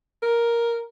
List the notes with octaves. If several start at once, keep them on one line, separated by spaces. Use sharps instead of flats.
A#4